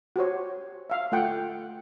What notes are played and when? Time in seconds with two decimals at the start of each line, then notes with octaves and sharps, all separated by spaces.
0.16 F#4 G4 C5 C#5
0.90 E5 F5
1.12 A3 F4 F#5 G5